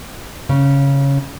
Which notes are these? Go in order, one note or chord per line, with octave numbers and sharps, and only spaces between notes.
C#3